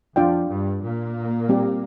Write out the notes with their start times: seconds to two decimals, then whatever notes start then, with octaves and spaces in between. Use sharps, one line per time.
0.16 F2 F3 D4 F4 D5 G5
0.49 G2 G3
0.82 A#2 A#3
1.49 G3 C4 G4 D5